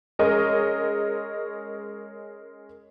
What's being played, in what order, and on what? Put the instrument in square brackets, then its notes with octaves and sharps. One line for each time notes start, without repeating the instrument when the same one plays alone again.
[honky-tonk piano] G#3 C#4 A#4 C#5 D#5